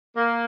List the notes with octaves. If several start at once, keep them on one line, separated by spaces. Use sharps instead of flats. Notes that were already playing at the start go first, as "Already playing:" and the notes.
A#3